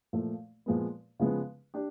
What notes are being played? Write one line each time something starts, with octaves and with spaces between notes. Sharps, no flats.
A#2 F3 A3
A#2 F3 G#3 B3
C#3 F3 G#3 B3
D4 G4